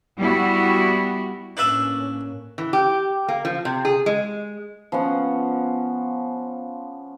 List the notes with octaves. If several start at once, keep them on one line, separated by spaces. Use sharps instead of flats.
G3 B3 E4 F#4
A2 A#3 C#4 D4 B4 E5
E3
G4
A#3
F3
C3
G#4
G#3
F3 B3 C#4 F#5